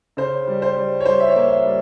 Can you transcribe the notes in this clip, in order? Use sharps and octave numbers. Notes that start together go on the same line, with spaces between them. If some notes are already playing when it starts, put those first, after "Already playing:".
C#3 C5
G3
C5
G3
C#5
G3 C5
E5
C#5
A#3
E5
G3